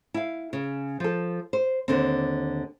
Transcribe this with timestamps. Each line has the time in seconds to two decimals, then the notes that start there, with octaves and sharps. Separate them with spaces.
0.14 E4 F5
0.53 C#3
1.00 F3 A4
1.53 C5
1.88 D#2 D3 C4